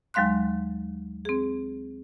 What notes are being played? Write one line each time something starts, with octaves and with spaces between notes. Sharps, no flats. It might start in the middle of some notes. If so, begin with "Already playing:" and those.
D#2 F#3 G#3 F5 C6 F#6
C4 G#4